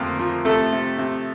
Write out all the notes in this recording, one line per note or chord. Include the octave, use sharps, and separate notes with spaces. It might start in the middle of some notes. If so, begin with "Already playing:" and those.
Already playing: F2 D3 A3 A#3 A#4
F3
C3 A3 A4
C3
C3